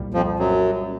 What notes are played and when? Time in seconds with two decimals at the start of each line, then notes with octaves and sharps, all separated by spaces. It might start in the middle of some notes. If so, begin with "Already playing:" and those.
Already playing: C2 A#2 G3
0.14 F2 F3
0.39 F#2 F#3